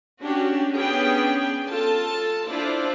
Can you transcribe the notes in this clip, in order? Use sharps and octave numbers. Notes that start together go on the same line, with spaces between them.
C#4 D4 F#4 G4
B3 C#4 D4 G#4 G5
F4 A4 A5
D4 E4 F4 C5 D5